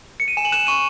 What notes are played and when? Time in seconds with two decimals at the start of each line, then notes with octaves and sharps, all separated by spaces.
0.20 C#7
0.28 D#7
0.37 G#5 E7
0.45 F#7
0.52 F#6 E7
0.67 C#6 D#7